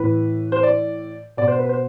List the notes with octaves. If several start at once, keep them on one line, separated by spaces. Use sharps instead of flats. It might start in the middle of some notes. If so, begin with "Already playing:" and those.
Already playing: A2 E3 B4
C5
D5
B2 D5
C5
B4
C5